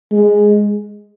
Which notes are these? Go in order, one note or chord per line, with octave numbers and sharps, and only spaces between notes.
G#3